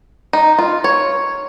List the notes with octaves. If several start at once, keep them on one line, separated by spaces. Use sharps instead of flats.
D#4
F4
C#5